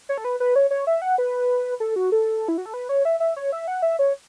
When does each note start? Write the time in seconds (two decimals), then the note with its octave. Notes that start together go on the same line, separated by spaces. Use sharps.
0.09 C#5
0.18 A4
0.24 B4
0.40 B4
0.56 C#5
0.71 C#5
0.87 E5
1.02 F#5
1.18 B4
1.80 A4
1.96 F#4
2.12 A4
2.48 E4
2.58 F#4
2.66 A4
2.74 B4
2.89 C#5
3.05 E5
3.20 E5
3.36 C#5
3.52 E5
3.68 F#5
3.82 E5
3.99 C#5